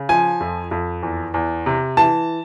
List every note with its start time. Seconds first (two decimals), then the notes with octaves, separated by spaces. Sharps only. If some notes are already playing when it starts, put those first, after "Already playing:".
Already playing: C#3
0.09 F3 G#5
0.41 F2
0.71 F2
1.03 E2
1.34 E2
1.66 C3
1.97 E3 A5